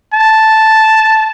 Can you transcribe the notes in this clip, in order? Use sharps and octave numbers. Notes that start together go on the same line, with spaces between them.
A5